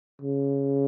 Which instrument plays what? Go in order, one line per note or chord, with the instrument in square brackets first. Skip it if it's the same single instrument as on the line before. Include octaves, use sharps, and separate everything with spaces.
[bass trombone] C#3